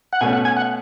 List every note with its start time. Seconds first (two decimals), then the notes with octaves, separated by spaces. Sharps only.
0.13 F#5
0.21 B2 A3 C#4 G#5
0.33 F#5
0.45 G#5
0.57 F#5